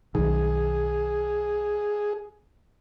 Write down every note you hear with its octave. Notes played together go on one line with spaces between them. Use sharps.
B1 D#3 G#4